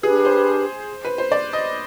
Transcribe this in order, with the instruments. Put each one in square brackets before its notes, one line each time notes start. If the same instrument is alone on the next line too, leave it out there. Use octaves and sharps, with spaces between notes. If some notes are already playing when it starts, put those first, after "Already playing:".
[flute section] D4 G4 B4 [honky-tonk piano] G#4
[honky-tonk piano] C5
B4
C5
D5
D#5